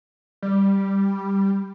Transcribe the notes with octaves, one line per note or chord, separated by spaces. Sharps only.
G3